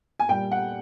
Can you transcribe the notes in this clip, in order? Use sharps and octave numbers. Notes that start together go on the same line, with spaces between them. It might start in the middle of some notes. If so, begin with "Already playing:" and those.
G#5
A#2 G3 G5
F#5